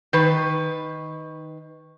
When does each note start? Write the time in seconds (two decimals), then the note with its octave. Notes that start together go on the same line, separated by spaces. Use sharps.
0.13 D#3 B4